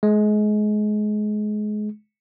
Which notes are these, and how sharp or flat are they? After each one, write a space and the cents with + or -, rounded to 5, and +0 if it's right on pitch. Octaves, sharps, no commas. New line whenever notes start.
G#3 +25